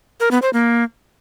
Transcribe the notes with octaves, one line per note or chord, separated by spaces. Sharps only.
A#4
B3
C5
A#3